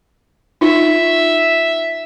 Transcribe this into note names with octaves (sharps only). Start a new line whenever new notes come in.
D#4 F4 E5